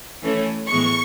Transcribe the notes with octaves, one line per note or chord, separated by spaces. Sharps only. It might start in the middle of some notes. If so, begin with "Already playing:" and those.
E3 A3 C#4
A2 E3 G#3 B3 C#6